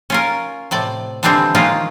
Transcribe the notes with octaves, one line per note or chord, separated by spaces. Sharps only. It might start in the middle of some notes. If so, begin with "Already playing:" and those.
C#4 F4 A#4
A2 C3 D5
D3 E3 G3 G#3 C4 D4
D#3 G#3 A#3 C#4 F4